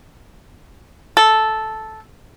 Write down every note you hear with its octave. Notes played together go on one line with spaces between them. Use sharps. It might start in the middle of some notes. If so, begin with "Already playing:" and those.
A4